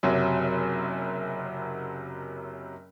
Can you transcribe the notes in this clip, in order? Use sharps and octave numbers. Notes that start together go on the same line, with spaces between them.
F#1 C3 F#3